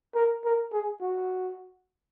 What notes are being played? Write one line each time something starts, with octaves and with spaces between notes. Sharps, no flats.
A#4
A#4
G#4
F#4